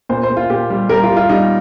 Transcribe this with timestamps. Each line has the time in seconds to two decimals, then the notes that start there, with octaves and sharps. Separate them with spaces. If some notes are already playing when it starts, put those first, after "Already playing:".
0.09 A#2 C5
0.23 C5
0.30 A#2
0.37 F4
0.50 A#2 G4
0.70 G3
0.89 G3 A#4
1.03 F4
1.09 G3
1.17 F4
1.29 G3 D#4